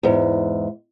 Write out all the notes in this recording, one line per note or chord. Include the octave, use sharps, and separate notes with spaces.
E2 G#2